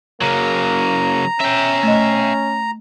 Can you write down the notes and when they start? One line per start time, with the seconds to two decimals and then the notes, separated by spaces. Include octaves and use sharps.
0.21 C#3 F#3 A#3 A#5
1.40 C#4 E5 G5
1.83 A3 D#5